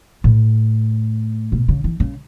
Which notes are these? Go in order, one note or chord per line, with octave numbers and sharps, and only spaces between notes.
A2
B2
C#3
E3
C#3